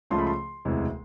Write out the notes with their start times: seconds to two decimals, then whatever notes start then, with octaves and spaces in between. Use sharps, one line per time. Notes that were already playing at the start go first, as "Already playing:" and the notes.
0.11 C#2 C#3 F3 A3 C6
0.18 B5
0.27 C6
0.65 E1 D2 C3 E3 G#3